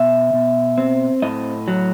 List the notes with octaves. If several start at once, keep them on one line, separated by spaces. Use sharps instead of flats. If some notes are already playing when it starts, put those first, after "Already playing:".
Already playing: B2 E5
B2
C4
A2 D#5
F#3